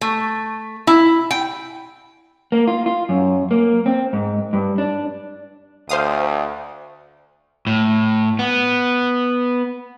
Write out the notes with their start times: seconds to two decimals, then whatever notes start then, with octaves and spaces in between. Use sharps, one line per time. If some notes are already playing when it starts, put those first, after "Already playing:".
0.01 A3
0.87 E4
1.31 G5
2.52 A#3
2.67 F4
2.86 F4
3.09 F#2
3.51 A#3
3.86 C4
4.13 G#2
4.53 G2
4.78 D4
5.89 D2 C5 F5 D#6
7.67 A2
8.39 B3